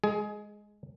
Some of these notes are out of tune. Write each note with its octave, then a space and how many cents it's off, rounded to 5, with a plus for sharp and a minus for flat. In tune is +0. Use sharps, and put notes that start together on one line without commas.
G#3 +0 G#4 +20